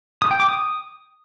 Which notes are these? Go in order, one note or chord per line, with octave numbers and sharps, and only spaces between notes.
D#6
G5
D6
D#6